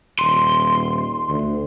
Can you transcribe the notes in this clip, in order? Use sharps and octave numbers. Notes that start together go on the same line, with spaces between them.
D#1 C6
D2